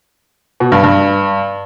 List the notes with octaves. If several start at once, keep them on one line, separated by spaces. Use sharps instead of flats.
B2
G2
G2